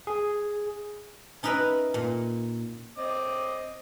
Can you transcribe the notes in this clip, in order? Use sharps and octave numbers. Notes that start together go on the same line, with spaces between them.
G#4
C#4 D#4 A#4 B4 E5 B5
A#2
C4 D#5 D6